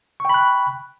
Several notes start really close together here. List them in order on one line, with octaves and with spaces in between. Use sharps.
C#6 G5 B5 F#6